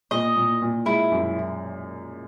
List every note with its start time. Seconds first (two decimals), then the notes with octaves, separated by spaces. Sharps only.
0.11 A#2 D#5
0.36 A#2
0.62 A#2
0.86 G#3 E4
1.12 F#2